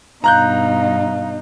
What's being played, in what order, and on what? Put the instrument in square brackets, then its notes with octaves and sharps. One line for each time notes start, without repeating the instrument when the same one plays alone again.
[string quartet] G2 B2 D#4 [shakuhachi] F5 [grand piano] A#5 F#6 G6